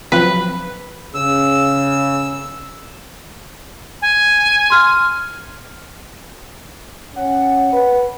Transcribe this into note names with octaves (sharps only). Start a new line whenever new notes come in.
F3 F#3 C4 B4
C#3 E6
G#5
C6 F6
C#4 F#5
B4